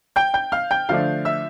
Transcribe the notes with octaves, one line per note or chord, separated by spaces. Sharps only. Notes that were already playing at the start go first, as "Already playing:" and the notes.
G5 G6
G5 G6
F5 F6
G5 G6
D3 F3 A3 D4 F5 F6
E5 E6